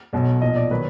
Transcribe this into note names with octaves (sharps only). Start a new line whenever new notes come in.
B1 B2 F#3
B1 A#2 F3 D#5
D5
D#3 F#3 B4